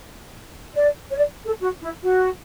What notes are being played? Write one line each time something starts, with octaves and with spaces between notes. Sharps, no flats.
D5
C#5
D5
A4
F#4
E4
F#4